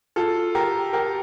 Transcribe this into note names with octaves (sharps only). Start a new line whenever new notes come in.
F4 A4
G4 A#4
G4 A#4